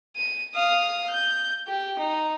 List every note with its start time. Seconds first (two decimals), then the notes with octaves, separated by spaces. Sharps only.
0.17 D#7
0.55 F5 D#6
1.09 G6
1.68 G4
1.99 D#4